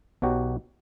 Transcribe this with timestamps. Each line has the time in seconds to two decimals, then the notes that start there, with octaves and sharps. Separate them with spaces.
0.22 B1 B2 F#3 F#4 G4